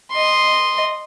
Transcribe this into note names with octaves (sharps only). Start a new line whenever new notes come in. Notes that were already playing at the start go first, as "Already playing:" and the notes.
D#5 C6